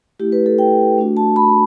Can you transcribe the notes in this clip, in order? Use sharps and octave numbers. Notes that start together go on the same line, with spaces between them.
A3 E4 G4
B4
A4
G5
A3 D4 F#4
A5
B5